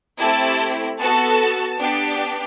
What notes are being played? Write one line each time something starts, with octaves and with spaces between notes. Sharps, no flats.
A3 C4 E4 G4 A5
B3 F#4 A4 A5
B3 D4 G4